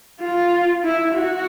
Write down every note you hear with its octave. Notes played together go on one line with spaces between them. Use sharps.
F4
E4
F#4